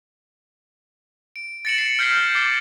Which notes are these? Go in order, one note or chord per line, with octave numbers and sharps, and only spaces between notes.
D7
A6 A#6 C#7 D7 E7 F#7
C7 C#7
F6 G6 G#6 B6 C7 G7
D6 A6 C7